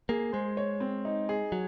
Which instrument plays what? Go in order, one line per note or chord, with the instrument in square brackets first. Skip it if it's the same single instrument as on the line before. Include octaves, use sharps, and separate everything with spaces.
[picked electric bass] A#3 [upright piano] G#4
[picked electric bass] G#3 [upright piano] C5
[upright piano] C#5
C4
D#4
G#4
[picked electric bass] F#3